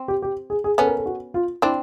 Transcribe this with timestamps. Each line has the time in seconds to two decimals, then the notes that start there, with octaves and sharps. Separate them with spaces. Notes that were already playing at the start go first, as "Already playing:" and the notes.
Already playing: C4
0.08 G4
0.22 G4
0.50 G#4
0.64 G#4
0.78 B3 C#4 A4
0.87 A#4
0.98 A4
1.06 F#4
1.34 F4
1.62 C4 D4 E4